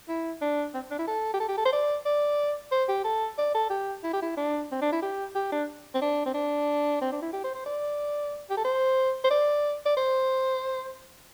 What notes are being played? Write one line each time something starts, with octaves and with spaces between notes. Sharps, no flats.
E4
D4
C4
D4
E4
A4
G4
A4
G4
A4
C5
D5
D5
C5
G4
A4
D5
A4
G4
E4
G4
E4
D4
C4
D4
E4
G4
G4
D4
C4
D4
C4
D4
C4
D4
E4
G4
C5
C5
D5
G4
A4
C5
C5
D5
D5
C5